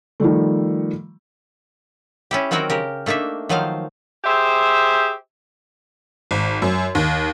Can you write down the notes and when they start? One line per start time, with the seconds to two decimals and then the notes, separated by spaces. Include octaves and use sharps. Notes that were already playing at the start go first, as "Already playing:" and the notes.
0.20 D#3 F3 G3 A3
2.31 C#4 E4 G4
2.51 D#3 F#3 C4 F#4 A#4 G5
2.70 C#3 G4 A#4
3.06 A3 A#3 D4 D#4 E5
3.49 D#3 F3 F#3 D#4 C5 F5
4.24 G4 G#4 C5 E5
6.31 G#1
6.62 F#2
6.95 D#2